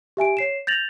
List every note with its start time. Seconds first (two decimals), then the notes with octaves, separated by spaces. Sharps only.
0.17 G4 E5 G#5 D7
0.37 C#5 C7 E7
0.67 G6 A6 A#6 F7 F#7